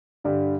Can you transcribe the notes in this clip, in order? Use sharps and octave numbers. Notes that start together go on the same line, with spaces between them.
G2 D3 G3